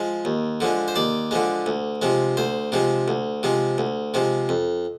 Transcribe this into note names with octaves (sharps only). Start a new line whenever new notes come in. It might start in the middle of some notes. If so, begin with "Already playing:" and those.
Already playing: F3 G#3
D#2
D3 F3 G#3
C5
D#2 D5
D3 F3 G#3
D2
C3 F3 G#3
D2 C5
C3 F3 G#3
D2
C3 F3 G#3
D2
C3 F3 G#3
F2